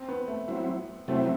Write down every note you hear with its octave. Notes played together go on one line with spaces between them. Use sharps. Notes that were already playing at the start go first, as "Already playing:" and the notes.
Already playing: C4
B3
A3
F#3 C4 E4
C3 F#3 A3 C4 E4